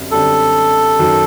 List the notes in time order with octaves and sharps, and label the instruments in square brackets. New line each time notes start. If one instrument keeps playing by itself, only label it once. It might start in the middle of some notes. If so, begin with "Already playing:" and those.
Already playing: [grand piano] F#2 D3 G3 C4
[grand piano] F#2 D3 G3 C4 [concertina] A4
[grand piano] F#2 D#3 F#3